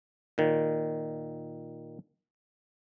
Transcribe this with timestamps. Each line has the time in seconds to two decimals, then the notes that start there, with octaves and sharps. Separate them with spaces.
0.38 A#2 D#3